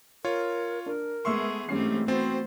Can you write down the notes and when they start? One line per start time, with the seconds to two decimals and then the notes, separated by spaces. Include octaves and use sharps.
0.25 F4 A#4 C#5
0.86 D4 A#4
1.25 G#3 A3 B3 G#4 E5 C6 C#6 E6
1.69 G#2 E3 A3 C4 C#4 G4 C7
2.08 B3 C4 F#4 C5 A6